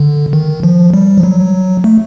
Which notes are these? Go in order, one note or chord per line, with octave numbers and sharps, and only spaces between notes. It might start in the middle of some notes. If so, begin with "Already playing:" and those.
Already playing: D3
D#3
F3
G3
F3
F#3
A3